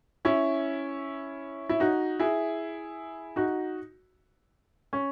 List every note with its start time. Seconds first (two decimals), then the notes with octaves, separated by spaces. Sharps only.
0.25 C#4 E4
1.69 E4
1.80 D#4 F#4
2.20 E4 G#4
3.36 D#4 F#4
4.93 C#4